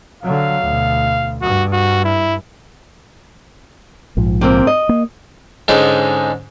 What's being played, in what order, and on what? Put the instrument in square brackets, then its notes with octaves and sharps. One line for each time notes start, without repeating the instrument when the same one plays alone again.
[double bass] D3 F#3 [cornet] F5
[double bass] D2 B2
[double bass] G2 [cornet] F#4
[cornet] F#4
E4
[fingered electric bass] A#1 G#2 F3
[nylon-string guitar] C3 A#3 C4
D#5
[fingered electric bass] A#3
[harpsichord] G#2 D3 G#3 C#4 D#4